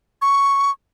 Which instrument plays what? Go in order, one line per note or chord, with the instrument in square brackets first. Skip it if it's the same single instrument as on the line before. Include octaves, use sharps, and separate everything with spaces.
[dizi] C#6